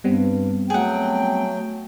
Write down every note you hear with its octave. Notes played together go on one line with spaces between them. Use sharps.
G2 G3 B3 C4
F#3 A3 G#4 F#5 G5